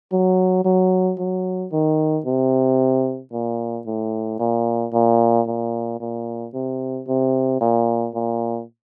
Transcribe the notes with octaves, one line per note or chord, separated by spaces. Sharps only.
F#3
F#3
F#3
D#3
C3
A#2
A2
A#2
A#2
A#2
A#2
C3
C3
A#2
A#2